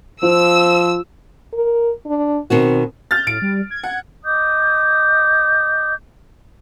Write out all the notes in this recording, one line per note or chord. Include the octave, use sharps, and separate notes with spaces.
F3 F4 C5 E6
A#4
D4
B2 D#3 C4 F#4
F6 G6 A6
A2 D7
G3
G#6
F#5
D#5 D6 D#6 G6